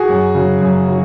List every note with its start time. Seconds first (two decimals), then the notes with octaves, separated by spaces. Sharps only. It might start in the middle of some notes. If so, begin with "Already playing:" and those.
Already playing: F#4 G#4
0.09 F#2
0.35 C#3 F#3
0.61 F#2
0.87 C#3 F#3